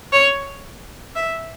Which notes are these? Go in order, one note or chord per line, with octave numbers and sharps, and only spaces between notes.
C#5
E5